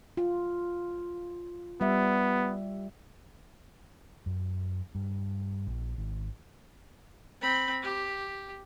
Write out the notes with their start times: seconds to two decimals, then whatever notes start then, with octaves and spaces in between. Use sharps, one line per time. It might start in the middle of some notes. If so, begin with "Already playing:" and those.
0.17 F4
1.81 G3 B3 E5
4.26 F#2
4.95 G2
5.67 A#1
5.98 G#1
7.41 C4 B5
7.82 G4